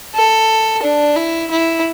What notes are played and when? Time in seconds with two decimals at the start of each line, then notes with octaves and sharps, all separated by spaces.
0.15 A4
0.83 D4
1.16 E4
1.51 E4